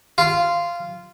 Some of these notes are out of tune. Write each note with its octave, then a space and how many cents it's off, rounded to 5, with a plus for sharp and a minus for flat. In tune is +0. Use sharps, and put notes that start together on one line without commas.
F4 -10